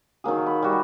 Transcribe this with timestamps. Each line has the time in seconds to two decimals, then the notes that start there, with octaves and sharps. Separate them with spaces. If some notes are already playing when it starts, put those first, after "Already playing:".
0.24 D#3 F#3 A#3 G#4
0.46 B5
0.62 G3 F#4 E5